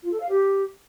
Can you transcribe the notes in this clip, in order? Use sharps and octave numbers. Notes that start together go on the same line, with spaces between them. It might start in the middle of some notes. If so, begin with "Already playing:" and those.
F4
A4
F5
G4